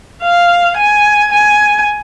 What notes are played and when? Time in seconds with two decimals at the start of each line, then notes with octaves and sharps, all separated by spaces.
0.22 F5
0.77 G#5
1.32 G#5